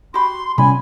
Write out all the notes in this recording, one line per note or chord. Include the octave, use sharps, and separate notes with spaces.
F#4 G4 B5 C6
C3 G3 C#4 G#5 B5